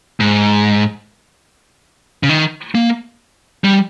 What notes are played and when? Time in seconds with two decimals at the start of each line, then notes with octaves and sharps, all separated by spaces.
0.20 G#2
2.23 C#3
2.29 D#3
2.75 A#3
3.64 G3